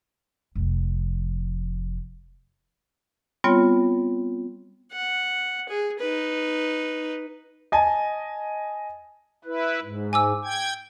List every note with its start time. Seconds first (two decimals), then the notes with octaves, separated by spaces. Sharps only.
0.55 F1 F3
3.44 G3 B3 C4 F4 C#5
4.93 F#5
5.69 G#4
5.99 D#4 B4
7.72 D#5 G#5 A5
9.45 E4 B4
9.82 G#2
10.13 G#5 D6 E6
10.44 G5 G#6